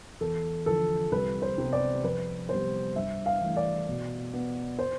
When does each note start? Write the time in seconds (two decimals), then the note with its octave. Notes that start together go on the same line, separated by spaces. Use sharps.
0.21 E2 A4
0.66 D3 F3 A4
1.12 C2 B4
1.42 C5
1.58 C3 G3 B3
1.73 D5
2.03 F2 B4
2.49 C3 G3 B3 C5
2.95 G2 E5
3.26 F5
3.41 E3 A3
3.56 D5
3.87 B2
4.33 B3
4.79 C5